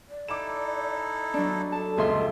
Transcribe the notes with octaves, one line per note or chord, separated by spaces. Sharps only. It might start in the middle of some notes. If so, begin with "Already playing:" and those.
D5
D#4 E4 A4 D6 E7
F#3 D4 D5
A4 A5
F1 C#2 A#2 F4 G#4 E5 C6